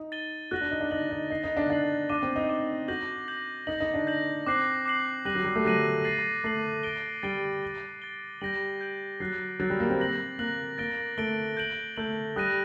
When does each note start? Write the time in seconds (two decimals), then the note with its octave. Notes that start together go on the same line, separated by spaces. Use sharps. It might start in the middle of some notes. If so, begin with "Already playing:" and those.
Already playing: D#4
0.12 A6 D#7 G7
0.51 F#4 F#6 A#6 F#7
0.61 D4
0.71 D#4
0.81 D4
0.91 D#4 F#6 A#6 F#7
1.11 D#4
1.30 D#4 A6 C7 F#7
1.44 D#4
1.57 D4
1.70 D4 A6 C7 F#7
2.09 D4 D6 A6 D#7 G7
2.23 C4
2.36 D#4
2.49 D6 A6 D#7 G7
2.88 F#4 G6 A#6 F#7
3.28 G6 A#6 F#7
3.67 D#4 G6 A#6 F#7
3.80 D#4
3.94 D4
4.07 G6 A#6 F#7
4.47 C4 D6 F#6 C7 F#7
4.86 D6 F#6 C7 F#7
5.25 G3 F#6 A#6 D#7 F#7
5.35 F#3
5.45 G3
5.55 A3
5.65 F#3 F#6 A#6 D#7 F#7
6.04 A6 C7 F#7
6.44 A3 A6 C7 F#7
6.83 A6 D7 G7
7.23 G3 A6 D7 G7
7.62 A6 D7 G7
8.02 A6 D7 G7
8.41 G3 G6 A#6 D7 F#7
8.81 G6 A#6 D7 F#7
9.20 F#3 F#6 A6 C7
9.60 F#3 F#6 A6 C7
9.70 G3
9.80 A#3
9.90 C4
9.99 F#6 A#6 F#7
10.39 A#3 F#6 A#6 F#7
10.78 A#3 A6 D7 G7
11.18 A3 A6 D7 G7
11.57 G6 D7 F#7
11.97 A3 G6 D7 F#7
12.36 G3 D#6 F#6 A#6 D#7